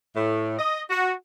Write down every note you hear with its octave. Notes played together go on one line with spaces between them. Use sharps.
A2
D#5
F#4